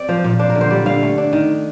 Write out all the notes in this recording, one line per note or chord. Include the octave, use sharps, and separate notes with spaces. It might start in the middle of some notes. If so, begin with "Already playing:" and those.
Already playing: C4 D5
F3 C5
A#2
D4 C5
A#4
D3
C5
G3 D5
D3 F5
A3
D4
D#3